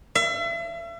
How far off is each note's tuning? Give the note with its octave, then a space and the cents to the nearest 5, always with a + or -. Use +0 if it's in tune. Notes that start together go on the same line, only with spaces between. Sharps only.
E5 +40